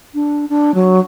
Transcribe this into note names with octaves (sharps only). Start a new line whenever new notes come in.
D4
D4
F#3